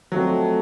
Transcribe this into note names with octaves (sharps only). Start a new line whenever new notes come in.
F3 F#3 A3 C4 D#4